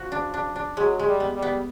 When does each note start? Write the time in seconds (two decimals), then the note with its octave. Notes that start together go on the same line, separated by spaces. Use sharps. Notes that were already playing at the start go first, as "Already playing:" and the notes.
Already playing: F3 F#4
0.12 D4
0.34 D4
0.56 D4
0.77 F#3 G#3
0.99 G#3
1.06 G3
1.20 B3
1.35 G3
1.42 B3